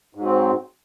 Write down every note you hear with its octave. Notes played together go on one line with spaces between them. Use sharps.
G#2 F#3 C4